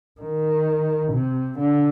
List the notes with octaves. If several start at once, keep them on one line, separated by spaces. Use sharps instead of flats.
D#3
C3
D3